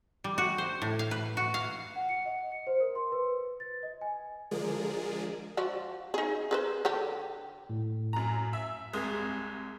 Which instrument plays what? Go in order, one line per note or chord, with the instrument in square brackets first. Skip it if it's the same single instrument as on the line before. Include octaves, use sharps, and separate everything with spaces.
[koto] G3
F#4
C5
A2
F5
B4
F#4
F5
[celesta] F#5
C#7
D#5
C#7
C5
A#4
C6
B4
A6
D#5
G#5
[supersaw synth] D3 F3 G#3 G#4 A#4 D5
[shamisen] F3 F#4 D5
D#4 G#4
G#4 B4 C5
D3 G4 G5
[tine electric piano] A2
[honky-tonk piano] F#2 A#5
E5
[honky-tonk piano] C2 G#3 [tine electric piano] D#6 G#6